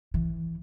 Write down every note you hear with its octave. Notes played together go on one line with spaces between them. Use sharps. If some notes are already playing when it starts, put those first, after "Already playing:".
E3